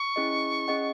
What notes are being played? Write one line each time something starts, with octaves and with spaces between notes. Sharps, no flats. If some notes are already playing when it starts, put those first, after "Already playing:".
Already playing: C#6
C#4 E4 G#4 D#5
C#4 G#4 D#5 F#5